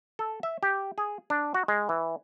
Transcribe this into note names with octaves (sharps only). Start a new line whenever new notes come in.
A4
E5
G4
G#4
D4
F#4
G#3
E3